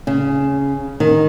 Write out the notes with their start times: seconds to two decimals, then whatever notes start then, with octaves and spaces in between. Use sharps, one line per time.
0.07 C#3
1.00 D#3